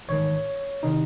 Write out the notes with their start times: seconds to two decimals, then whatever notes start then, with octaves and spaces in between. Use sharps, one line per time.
0.08 A1 G#2 D#3 C#5
0.83 C3 D#3 D#4